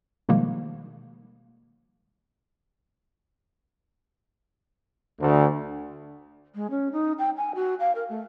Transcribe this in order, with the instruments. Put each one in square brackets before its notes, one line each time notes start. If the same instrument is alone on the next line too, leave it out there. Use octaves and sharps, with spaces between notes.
[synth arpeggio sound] B2 D#3 F3 G3 G#3 A#3
[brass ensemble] D2
[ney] G#3
C#4
D#4
G5
G#5
F#4
F5
A#4
A3